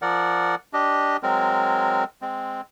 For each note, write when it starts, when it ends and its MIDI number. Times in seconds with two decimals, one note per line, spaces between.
0.02 0.55 53
0.02 0.55 70
0.02 0.55 74
0.02 0.55 78
0.73 1.17 62
0.73 1.17 67
0.73 1.17 75
1.23 2.04 54
1.23 2.04 56
1.23 2.04 60
1.23 2.04 70
2.22 2.61 56
2.22 2.61 60